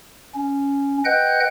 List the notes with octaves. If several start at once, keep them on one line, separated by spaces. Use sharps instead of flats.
C#4
B4 D#5 F#5 G5 F#6 G6